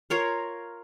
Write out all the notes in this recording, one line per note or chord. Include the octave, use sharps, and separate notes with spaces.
F4 A#4 C#5